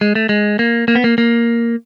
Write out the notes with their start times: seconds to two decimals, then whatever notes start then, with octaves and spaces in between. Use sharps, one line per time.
0.01 G#3
0.15 A3
0.29 G#3
0.59 A#3
0.88 A#3
0.95 B3
1.04 A#3
1.18 A#3